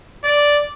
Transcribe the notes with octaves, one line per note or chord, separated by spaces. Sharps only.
D5